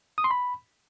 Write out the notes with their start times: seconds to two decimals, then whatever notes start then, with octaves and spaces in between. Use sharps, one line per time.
0.18 D#6
0.24 C6
0.31 B5